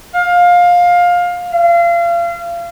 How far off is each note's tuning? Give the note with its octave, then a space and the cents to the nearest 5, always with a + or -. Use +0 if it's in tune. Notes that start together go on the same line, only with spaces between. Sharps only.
F5 +20
F5 -30